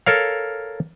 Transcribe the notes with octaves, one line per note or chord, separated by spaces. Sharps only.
A4 A#4 C#5 F5